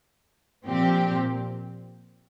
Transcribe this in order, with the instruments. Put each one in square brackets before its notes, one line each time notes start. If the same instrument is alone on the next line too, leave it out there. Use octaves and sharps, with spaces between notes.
[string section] A#2 F3 C4 G4